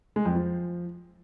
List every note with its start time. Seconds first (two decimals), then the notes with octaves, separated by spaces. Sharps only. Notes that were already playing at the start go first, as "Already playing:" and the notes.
0.16 G#3
0.25 F2
0.35 F3